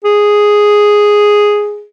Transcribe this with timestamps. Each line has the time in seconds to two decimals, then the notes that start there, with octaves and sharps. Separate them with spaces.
0.04 G#4